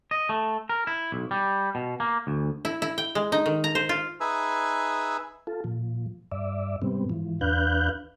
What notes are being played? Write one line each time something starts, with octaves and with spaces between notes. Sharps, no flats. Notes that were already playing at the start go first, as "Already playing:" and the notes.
D#5
A3
A#4
E4
B1
G3
B2
A#3
D2
E4
E4
G5
G#3
D#4
D#3
A#5
C5
F4
D#4 G#4 B4 E5 G#5 E6
F4 A4
A#2 F3
G2 D5 E5
G#2 C3 G3 B3 C4
G#2 E3 F3
E2 D4 B4 F5 F#6 G6